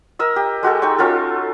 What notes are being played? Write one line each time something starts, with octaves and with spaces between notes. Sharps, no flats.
A#4 D#5 E6
G4
G#3 F#4 G4 A4
D#4 G5 C#6
C#4 F4 F#4 A4